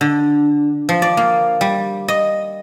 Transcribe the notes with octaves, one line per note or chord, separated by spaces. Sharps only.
D3
F3
D5
A#3
G3
D#5